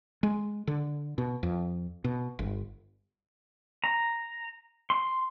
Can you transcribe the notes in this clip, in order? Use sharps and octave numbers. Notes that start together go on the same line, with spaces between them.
G#3
D3
B2
F2
B2
G1
A#5
C6